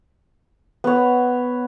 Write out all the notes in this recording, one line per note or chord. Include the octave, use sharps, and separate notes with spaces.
B3 C#5